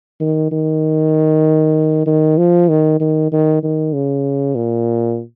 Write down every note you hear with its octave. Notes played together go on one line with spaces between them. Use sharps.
D#3
D#3
D#3
F3
D#3
D#3
D#3
D#3
C#3
A#2